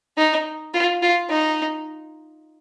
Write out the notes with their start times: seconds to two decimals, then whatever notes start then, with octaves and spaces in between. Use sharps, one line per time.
0.18 D#4
0.74 F4
1.02 F4
1.30 D#4